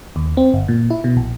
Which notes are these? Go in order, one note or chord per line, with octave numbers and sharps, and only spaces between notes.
D#2
C4
G1
A#2
E4
B2
A#1